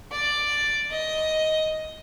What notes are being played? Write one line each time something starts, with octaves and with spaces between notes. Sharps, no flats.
D5
D#5